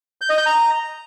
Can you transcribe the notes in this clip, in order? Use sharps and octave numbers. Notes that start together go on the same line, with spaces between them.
G6
D#5
G6
A#5